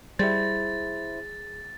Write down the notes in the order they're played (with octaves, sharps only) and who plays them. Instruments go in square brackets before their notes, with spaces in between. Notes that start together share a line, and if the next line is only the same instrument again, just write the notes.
[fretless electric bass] G3 [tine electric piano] E4 C5 [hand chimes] G#4 [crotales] A6